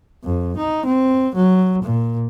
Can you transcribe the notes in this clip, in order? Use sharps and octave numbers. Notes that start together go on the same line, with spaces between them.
F2
D#4
C4
F#3
A#2